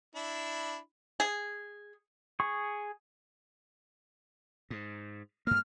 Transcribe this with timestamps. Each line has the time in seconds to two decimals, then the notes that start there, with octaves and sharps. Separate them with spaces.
0.15 D4 E4 B5
1.20 G#4
2.40 G#4 C#6
4.70 G#2
5.47 G2 A#3 F6